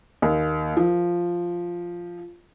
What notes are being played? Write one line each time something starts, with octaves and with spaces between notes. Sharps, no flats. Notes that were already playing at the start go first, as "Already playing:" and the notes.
D#2
F3